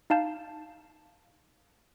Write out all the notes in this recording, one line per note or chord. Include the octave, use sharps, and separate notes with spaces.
D#4 F5 A5 G6